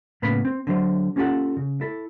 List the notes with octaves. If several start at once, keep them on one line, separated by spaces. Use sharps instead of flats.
A2 C#3 A#3 B3 B5
C4
D3 F#3 C5
A#3 C#4 F4 G4 A4 F#5
C#3
E4 A4